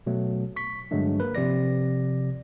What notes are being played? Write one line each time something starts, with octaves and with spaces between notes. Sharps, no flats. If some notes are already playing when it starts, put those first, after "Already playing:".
B2 F#3 A3
C#6 B6
G2 D3 F#3 G#3 A3 D4
A#3 A#4 B4
C3 F3 D5 A#6